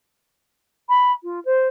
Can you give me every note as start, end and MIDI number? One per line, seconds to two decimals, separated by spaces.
0.89 1.12 83
1.23 1.39 65
1.45 1.67 72